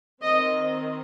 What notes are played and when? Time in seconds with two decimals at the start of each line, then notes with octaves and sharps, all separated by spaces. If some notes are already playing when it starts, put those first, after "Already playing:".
0.22 D#3 C4 D#5